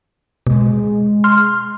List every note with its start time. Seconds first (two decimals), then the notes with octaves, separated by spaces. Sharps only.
0.47 B2 G#3
1.24 C6 F6